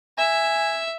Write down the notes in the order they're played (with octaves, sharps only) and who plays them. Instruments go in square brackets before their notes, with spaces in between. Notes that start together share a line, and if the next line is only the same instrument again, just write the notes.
[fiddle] E5 [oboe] G#5